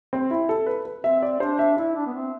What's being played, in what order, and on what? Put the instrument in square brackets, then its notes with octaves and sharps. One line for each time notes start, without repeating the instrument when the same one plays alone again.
[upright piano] C4
E4
A4
B4
B4
[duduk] C4 [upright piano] E5
[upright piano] D5
[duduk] D4 [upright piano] C5
[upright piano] E5
[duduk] E4 [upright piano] E5
[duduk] D4
B3
C4